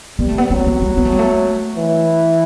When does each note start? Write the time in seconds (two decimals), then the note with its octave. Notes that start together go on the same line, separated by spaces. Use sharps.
0.19 G3 B3
0.28 A3
0.38 B3
0.50 F#3 C4
0.66 B3
0.82 G3
0.97 B3
1.05 A3
1.12 G3
1.19 A3
1.76 E3